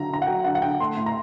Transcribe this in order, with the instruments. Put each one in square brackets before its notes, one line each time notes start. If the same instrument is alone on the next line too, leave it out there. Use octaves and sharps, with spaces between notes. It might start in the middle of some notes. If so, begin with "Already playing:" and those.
Already playing: [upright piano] D3 F#3 A#5
D3 A#5
F#5
F#3 G5
D3 F#5
F#5
D3 G5
A3 C6
A2
A#5